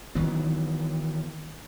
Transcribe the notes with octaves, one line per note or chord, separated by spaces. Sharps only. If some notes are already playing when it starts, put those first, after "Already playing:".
D#3 E3 F#3 B3